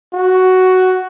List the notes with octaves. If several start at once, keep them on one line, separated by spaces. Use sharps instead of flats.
F#4